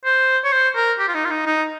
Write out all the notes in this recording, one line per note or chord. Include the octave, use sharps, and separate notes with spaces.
C5
C#5
C5
A#4
G4
F4
D#4
F4
D#4
D#4